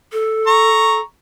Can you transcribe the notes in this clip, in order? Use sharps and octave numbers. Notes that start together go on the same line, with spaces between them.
A4
A#5 C#6